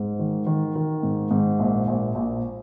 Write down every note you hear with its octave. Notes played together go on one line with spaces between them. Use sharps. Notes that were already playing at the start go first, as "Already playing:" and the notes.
Already playing: G#2
D#3
D#3
D#3
G#2
G#2
A#1
A#1
A#1